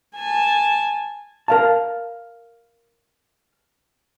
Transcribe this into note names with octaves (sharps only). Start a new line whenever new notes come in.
G#5 A5
A#4 F5 A5